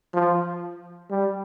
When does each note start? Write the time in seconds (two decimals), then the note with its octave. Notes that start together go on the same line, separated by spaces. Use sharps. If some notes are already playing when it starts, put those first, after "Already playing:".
0.14 F3
1.11 G3